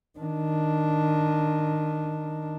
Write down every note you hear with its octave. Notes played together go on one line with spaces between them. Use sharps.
D#3 D4